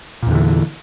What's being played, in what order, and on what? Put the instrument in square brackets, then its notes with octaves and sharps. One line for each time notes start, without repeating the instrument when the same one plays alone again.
[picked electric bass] A#2
E2
D3
E3